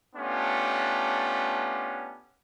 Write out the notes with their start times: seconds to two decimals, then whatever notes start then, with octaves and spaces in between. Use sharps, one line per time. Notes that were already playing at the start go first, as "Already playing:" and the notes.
0.16 A3 B3 C#4 D4 F4 G4